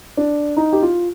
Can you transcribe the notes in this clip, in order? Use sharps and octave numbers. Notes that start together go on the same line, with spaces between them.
D4
D#4
G4
F4